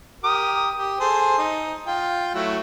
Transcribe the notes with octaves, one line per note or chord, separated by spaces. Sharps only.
G4 A#4 D#6
G4
G#4 A4 C5
D#4
F4 G5
F#3 A3 E4